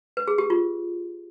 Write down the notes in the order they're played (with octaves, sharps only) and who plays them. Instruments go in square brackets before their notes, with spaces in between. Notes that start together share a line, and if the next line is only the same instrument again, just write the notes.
[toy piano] B4
G#4
G4
F4